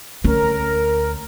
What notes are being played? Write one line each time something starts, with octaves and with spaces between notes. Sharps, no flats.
D2 C#4 A#4